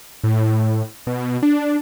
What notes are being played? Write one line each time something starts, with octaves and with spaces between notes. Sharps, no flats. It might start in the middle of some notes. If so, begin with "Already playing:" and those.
A2
B2
D4